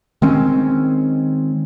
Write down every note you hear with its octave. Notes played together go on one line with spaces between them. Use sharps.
D#3 G#3 C4 C#4